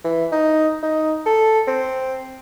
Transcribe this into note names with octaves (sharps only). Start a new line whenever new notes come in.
E3
D#4
D#4
A4
C4